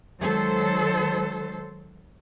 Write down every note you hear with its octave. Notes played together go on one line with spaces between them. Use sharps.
D#3 F#3 G#3 A4 C5